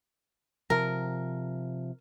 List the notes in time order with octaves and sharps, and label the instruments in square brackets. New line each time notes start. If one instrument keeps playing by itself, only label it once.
[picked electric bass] C3 F3 [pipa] A#4